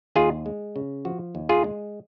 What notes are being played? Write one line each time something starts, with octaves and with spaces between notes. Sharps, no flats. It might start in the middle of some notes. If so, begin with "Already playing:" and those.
D#2 F4 G#4
G#3
C#3
F3 F#4
D#2
F4 G#4
G#3